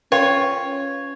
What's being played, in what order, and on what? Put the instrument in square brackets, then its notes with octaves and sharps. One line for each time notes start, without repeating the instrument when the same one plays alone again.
[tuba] C#4 [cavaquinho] F4 C#5 [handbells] B4 G5